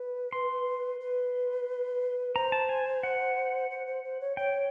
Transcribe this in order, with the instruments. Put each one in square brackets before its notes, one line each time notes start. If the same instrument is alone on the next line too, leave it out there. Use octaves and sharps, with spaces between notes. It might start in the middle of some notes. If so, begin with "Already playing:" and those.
Already playing: [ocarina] B4
[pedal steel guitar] C6
[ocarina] B4
[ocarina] C5 [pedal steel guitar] A#5
[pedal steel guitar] A5
G#5
F#5
[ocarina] C5
C5
C5
C#5
[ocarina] C#5 [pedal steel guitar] G5